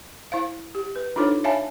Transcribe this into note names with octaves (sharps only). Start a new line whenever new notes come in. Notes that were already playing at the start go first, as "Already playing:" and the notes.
E4 C5 F5
G4
B4
D4 D#4 F4 A4 C5 C#5
C#5 E5 F5 G#5 A5 B5